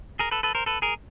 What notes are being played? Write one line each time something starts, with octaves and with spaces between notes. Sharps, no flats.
G#4 A#4
A4 B4
A4 B4
A#4 C5
A4 B4
G#4 A#4